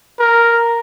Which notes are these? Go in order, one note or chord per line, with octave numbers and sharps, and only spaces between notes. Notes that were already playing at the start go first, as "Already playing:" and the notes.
A#4